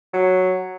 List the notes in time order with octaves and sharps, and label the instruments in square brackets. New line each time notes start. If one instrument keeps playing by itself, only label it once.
[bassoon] F#3